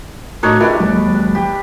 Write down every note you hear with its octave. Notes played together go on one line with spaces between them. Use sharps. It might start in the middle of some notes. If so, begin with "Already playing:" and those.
A2 D4 D#4 F#4 A#4 C#5
G3 D#4 F4 G#4 A#4 B4 D5 E5
D#2 F#3 G#3
G4